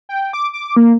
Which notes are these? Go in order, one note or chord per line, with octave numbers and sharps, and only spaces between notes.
G5
D6
D6
A#3